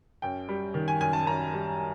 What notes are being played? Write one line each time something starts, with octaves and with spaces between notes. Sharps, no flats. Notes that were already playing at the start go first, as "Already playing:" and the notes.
F#2 G5
G3
D#3
G#5
F#2 G#5
A5
F#2 A#5
G3